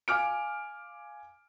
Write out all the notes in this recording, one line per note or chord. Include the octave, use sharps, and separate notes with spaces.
F5 G#5 D6 F6 D7